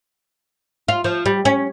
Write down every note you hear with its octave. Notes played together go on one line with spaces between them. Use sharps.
F4
F3
G3
C#4